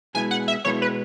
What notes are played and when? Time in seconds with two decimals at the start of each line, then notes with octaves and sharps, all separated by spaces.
0.15 B2 G#3 B3 E4 G#5
0.31 F#5
0.48 E5
0.64 B2 G#3 B3 E4 C#5
0.82 B4